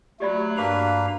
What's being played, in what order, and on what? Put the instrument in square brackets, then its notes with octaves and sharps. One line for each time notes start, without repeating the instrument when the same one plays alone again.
[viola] F#3 [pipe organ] A3 [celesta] G4 D5 B5
[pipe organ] G2 F5 A#5 [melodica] A#3 D4 B4